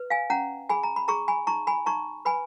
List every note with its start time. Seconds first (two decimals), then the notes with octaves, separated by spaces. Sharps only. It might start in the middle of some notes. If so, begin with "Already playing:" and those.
Already playing: B4
0.10 F5 G#5
0.30 C#4 F#5 A#5
0.69 G#4 G#5 B5
0.83 A#5
0.96 B5
1.08 G#4 A#5 C#6
1.28 G#5 B5
1.47 D#4 A#5 C#6
1.67 G#5 B5
1.86 D#4 A#5 C#6
2.25 B4 G#5 B5